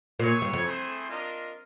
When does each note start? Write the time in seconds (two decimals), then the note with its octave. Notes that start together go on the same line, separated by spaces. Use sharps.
0.20 A#2 E4 G#4 C#5
0.42 G2
0.54 F2
0.64 A3 C4 E4 G#4 C5
1.08 D4 F4 A#4 D#5